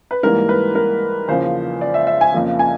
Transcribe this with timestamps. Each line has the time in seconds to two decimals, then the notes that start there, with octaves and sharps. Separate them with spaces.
0.11 B4
0.23 G#2 E3 G3 A#3 A#4
0.49 B4
0.75 A#4
1.28 E2 C#3 F3 A#3 C5
1.81 D5
1.94 E5
2.07 E5
2.21 G#5
2.34 F2 C#3 F3 A#3
2.59 G#5